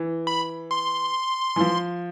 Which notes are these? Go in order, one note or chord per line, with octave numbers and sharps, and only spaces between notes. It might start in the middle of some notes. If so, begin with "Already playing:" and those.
Already playing: E3
B5
C6
E3
F3